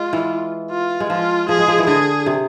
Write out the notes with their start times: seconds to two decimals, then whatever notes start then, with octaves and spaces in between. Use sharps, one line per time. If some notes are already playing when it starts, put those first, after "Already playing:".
Already playing: G#3 F4
0.13 E3
0.71 F4
1.00 G#3
1.09 F3 F4
1.49 F3 G#4
1.59 G#3
1.68 F3
1.78 E3
1.87 D3 G#4
2.26 C3